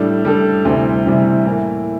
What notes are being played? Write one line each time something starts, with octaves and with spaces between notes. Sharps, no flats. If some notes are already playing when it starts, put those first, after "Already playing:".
Already playing: A2 G3 D4 A4
A2 G3 D4 A4
D2 C3 E3 G3
D2 C3 E3 G3
A2 E3 A#3